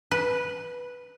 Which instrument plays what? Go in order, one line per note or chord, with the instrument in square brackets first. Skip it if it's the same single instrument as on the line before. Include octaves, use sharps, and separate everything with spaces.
[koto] B4